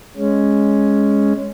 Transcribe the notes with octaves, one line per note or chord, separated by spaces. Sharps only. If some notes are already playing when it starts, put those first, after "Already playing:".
G#3 C#4